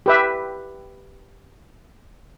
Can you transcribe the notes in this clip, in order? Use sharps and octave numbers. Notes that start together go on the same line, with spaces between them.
G4 B4 E5